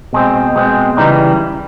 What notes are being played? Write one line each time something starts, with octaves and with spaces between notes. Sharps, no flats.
B2 G#3 C4
B2 G#3 C4
C#3 E3 G3 D#4